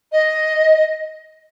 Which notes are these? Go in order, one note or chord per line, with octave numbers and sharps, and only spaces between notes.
D#5